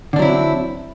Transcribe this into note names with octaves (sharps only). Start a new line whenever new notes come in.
D3 F#3 C4 D4 E4